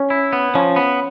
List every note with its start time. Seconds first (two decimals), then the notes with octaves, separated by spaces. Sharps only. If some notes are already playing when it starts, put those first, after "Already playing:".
Already playing: C#4
0.10 E4
0.33 B3
0.55 F3 C#4
0.76 B3